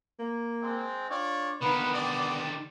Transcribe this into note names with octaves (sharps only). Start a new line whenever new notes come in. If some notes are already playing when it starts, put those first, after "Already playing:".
A#3
G#3 C4
D4 F4 C#5 D5
D3 D#3 A#3 B3 B4
G4 D5